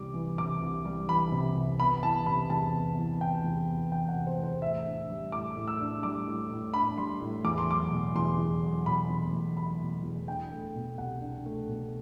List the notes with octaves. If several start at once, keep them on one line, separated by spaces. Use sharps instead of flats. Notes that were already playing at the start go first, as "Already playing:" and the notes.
Already playing: C2 C3 E3 G3 D6
E3
C3 D6
C2
G3
E3 B5
C3
C2
B3 B5
E3 A5
C3 B5
E2 A5
B3
E3
C3 G5
E2
B3
E3 G5
F#5
C3
C5
E2
C5
A2 E5
D4
G3
A2 D6
A2
E6
D4
G3 D6
A2
A2
D4 B5
G3 C6
A2
E2 D6
C6
F#3 D6
B2
E2 C6
E2
F#3
B2 B5
E2
E2
F#3 B5
B2
E2
D4 G5
A3
B2
C2 F#5
D4
A3
B2